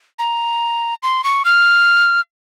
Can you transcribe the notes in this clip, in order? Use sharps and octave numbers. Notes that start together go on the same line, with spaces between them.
A#5
C6
C#6
F6